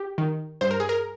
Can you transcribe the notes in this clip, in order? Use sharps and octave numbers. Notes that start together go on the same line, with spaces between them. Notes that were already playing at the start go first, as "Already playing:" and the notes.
Already playing: G4
D#3
G2 C5
A#4
G#4
A#4